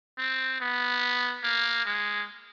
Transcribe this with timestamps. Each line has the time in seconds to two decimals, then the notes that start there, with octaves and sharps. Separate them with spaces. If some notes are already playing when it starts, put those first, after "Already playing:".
0.18 C4
0.60 B3
1.43 A#3
1.85 G#3